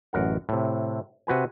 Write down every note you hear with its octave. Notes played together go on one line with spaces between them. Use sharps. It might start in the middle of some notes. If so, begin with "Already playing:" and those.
A1 F#2 A#4 F#5
A2 C3
C3 F#4 B4 G#5